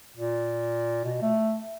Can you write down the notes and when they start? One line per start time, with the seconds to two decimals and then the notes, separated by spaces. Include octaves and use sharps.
0.17 A#2
1.05 B2
1.21 A3